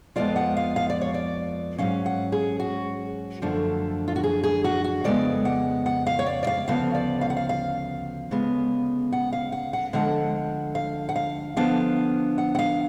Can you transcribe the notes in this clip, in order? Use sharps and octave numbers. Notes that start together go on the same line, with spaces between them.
F2 F3 G#3 B3 F4 D5
F#5
F5
F5
D5
C#5
D5
G#2 F#3 C#4 F5
F#5
G#4
F#4
F#2 D3 F3 A3 D4
F4
F#4
G#4
G#4
F#4
F#4
F2 C#3 G#3 B3 D5
F#5
F#5
F5
C#5
D5
D5
F5
D2 C#3 F3 B3 F5
D5
F5
F#5
F5
F5
D2 C#3 G#3 B3
F#5
F5
F#5
F#5
D2 D3 F3 G#3 F#5
F5
F#5
F5
D3 F3 B3 D4 F5
F#5
F#5
F5